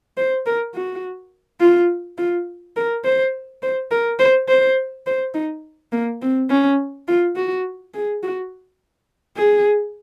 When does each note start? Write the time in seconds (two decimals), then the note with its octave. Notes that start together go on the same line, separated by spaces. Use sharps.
0.17 C5
0.46 A#4
0.74 F#4
1.60 F4
2.18 F4
2.77 A#4
3.04 C5
3.63 C5
3.91 A#4
4.19 C5
4.49 C5
5.07 C5
5.34 D#4
5.92 A#3
6.22 C4
6.50 C#4
7.08 F4
7.36 F#4
7.94 G#4
8.23 F#4
9.37 G#4